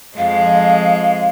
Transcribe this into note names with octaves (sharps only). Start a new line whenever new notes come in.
F2 G#3 F5